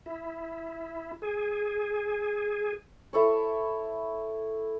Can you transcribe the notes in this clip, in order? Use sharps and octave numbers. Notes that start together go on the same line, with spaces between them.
E4
G#4
E4 A4 C#5